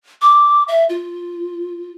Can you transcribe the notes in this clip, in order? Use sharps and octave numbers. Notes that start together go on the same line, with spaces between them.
D6
E5
F4